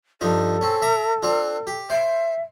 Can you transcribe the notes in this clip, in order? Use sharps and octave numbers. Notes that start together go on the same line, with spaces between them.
G2 F3 D#4 A4
C4 C#4
E5 A#5 D6
C4 D4 F4
G4
C5 E5